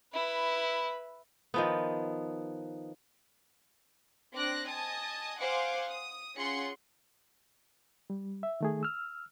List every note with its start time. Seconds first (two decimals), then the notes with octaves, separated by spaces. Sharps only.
0.14 E4 B4
1.54 D#3 F3 B3
4.34 C4 D4 D6 F#6 A#6
4.67 D#5 G#5 A5 D#6
5.40 C5 F5 F#5 G#5 C6 D6
5.87 D#6
6.36 C#4 F4 G#4 F#5 C6 C#7
8.10 G3
8.43 E5
8.61 D#3 A3 G#4
8.83 E6 F6